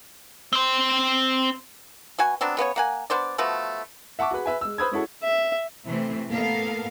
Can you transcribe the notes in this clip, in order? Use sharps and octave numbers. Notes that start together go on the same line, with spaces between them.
C4 C5
B2 F#4 G#5
F#3 B3 C4 D4
C#3 B3 D4 C#5
A#3 F#5 G#5
B3 D4 C5 D5
F3 A3 B3 F#4
E5 F#5 A5 C#6 D6
F#4 G#4 B4 B5
B4 E5 G#5
G#3 E6
B4 C5 B5 D#6 E6 G#6
G#3 C#4 E4 F#4 A4
E5
C3 E3 A3 C4
A2 A#3 B3 A4 A#4 F5